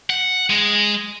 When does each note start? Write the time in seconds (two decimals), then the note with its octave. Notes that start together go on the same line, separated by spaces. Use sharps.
0.10 F#5
0.50 G#3